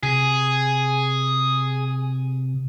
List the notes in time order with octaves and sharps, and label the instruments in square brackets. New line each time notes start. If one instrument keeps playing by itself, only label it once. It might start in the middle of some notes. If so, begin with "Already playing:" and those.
[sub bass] C3 [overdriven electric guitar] G#4